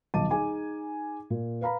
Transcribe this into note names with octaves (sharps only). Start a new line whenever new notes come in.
D#1 B1 D#5 A5 D6 D#7
D#4 G#4 G#5 D6
A#2
B4 F5 A#5 B5